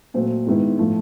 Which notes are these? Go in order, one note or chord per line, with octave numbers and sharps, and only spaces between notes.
A#2 F#3 A3 C4
G#2 D#3 G#3 B3 E4
A2 F3 A3